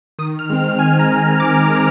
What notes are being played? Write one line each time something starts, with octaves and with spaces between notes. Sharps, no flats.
D#3 D#6
F6
G#3 C4
F6
D#3 G#5
A#5
G#3 C4
A#5
D#3 D6
G#3 C4